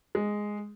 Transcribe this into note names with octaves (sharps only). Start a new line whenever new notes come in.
G#3